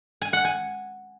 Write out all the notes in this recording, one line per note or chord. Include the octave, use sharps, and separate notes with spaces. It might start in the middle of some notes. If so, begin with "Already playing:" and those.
G#5
F#5
G#5